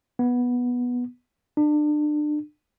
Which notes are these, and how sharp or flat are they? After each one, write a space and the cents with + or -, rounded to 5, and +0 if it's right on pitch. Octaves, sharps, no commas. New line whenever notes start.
B3 -10
D4 +30